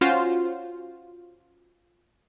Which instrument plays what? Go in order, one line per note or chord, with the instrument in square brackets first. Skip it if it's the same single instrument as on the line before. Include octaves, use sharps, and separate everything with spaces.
[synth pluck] C#4 F4 F#4 C5